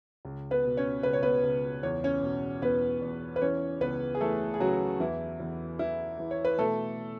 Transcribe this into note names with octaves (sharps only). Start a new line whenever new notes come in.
C#2
B3 B4
B2
C#4 C#5
C#2 B4
C#5
B3 B4
C#2
E2 C#5
C#4 C#5
B2
E2 B3 B4
E2
B4
E3 C#4 C#5
C#2 B3 B4
G#4
E3 A3 A4
G#4
C#3 F#3 F#4
E2 E3 E4
E2
E3 E4
E3
C#5
B4
B2 A3 A4